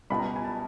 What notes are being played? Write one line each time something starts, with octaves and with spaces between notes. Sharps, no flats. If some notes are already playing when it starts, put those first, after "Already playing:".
C#2 B2 G3 B5
A#5
G#5
A5